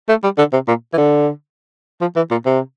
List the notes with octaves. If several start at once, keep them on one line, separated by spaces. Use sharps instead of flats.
A3
G3
D3
C3
A#2
E3
D3
F3
E3
A#2
C3